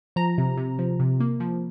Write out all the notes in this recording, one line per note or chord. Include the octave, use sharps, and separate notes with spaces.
F3 A#5
C3
C3
F3
C3
A#3
F3